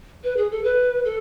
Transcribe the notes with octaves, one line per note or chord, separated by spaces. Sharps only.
B4
G#4
A4
B4
A4